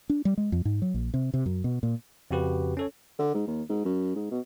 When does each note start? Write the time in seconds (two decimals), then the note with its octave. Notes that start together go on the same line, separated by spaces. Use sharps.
0.10 D4
0.25 G3
0.38 G#3
0.52 F2
0.65 G#2
0.82 F#3
0.94 A#1
1.14 C3
1.34 C3
1.46 F#2
1.64 B2
1.83 A#2
2.31 F2 C#3 F#4 G4 B4
2.77 C#4 A4 C#5
3.19 D3
3.34 G#2
3.47 D#2
3.70 G#2
3.85 F#2
4.15 G#2
4.31 B2